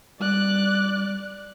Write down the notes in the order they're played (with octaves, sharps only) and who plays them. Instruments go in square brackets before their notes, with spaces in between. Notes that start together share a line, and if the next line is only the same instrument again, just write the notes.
[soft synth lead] G3 [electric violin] D5 F#6